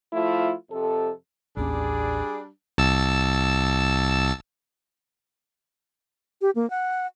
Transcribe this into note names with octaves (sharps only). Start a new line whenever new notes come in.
F3 A3 E4 F4
F2 C3 A4
A1 D#2 G3 C#4 D4 G#4
C2 A5 E6
G4
A#3
F#5